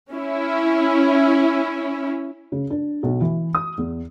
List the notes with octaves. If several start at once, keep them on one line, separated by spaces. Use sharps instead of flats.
C#4 E4
C#3
D4
B1
E3
D#6
E2